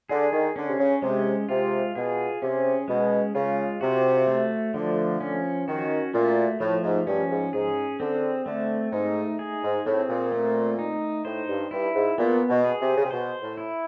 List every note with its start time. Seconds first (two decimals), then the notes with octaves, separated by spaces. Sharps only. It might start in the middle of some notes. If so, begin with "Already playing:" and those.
0.09 D3 G#4
0.32 D#3
0.56 D3 C#4
0.67 C3
0.78 C#3
1.02 C3 G#3
1.49 C3 F4
1.95 B2 G#4
2.42 C3 C#4
2.88 B2 G#3
3.34 C#3 F4
3.81 C3 F#4
4.27 A3
4.74 D3 F3
5.20 C#4
5.68 D#3 F#4
6.13 A#2 A3
6.60 A2 F3
6.83 G#2
7.06 G2 C#4
7.30 G#2
7.53 G#2 G#4
7.99 D3 C4
8.46 D3 A3
8.92 G#2 D#4
9.39 G#4
9.63 G#2
9.85 A2 C4
10.09 A#2
10.32 A3
10.79 D#4
11.25 A2 C5
11.49 G2
11.71 G2 E4
11.95 G#2
12.18 A#2 B3
12.49 B2
12.64 G#4
12.80 C3
12.96 C#3
13.04 C3
13.11 B2 C5
13.42 A2
13.58 E4